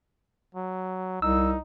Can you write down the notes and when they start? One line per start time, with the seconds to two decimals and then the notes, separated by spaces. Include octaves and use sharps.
0.55 F#3
1.22 C2 D#4 E6